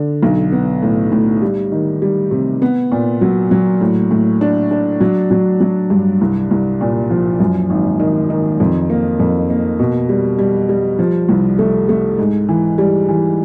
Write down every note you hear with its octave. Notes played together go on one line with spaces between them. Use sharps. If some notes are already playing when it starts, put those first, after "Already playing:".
Already playing: D3
B1
B3
A2
A2
G3
D#3
G3
C3
B3
A#2
F#3
F#3
A2
A2
D4
D4
F#3
F#3
F#3
G2
C2
C2
A#2
F3
F#2
G#1
D#3
D#3
F2
A#3
F2
A#3
B2
G3
G3
G3
F3
C2
A3
A3
G#2
E3
G3
E3